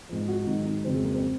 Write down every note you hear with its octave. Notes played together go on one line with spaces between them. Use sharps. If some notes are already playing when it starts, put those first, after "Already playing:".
G#2 F3
F#4
G#2 D#3 F#3 D#4
D#4
F2 C#3 F#3 C4
G#3
A#3
C4